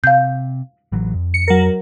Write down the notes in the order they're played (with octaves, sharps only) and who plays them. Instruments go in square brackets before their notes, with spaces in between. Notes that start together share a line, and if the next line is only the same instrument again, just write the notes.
[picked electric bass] C3 [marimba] F5 G6
[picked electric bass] A1 E3 F#3
F2
[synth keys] C#7
F#3 A#4